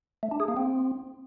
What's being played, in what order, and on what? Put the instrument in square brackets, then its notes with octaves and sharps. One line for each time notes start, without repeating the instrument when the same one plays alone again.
[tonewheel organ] A3
D4
G#4
A#3
C4